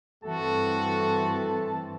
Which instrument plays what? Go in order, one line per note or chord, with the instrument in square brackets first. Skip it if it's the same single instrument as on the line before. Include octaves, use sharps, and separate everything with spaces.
[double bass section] G2 E3 C4 [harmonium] A3 A4 [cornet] F#4 [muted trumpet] A5